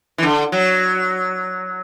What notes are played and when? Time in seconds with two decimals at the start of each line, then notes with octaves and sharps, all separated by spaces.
0.18 E3
0.23 D3
0.52 F#3